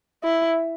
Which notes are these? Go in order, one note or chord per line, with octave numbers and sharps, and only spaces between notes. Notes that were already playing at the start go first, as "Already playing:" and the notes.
E4